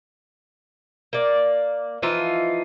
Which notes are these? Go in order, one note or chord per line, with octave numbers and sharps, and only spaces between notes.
A#3 D5
E3 F3 D#4 F4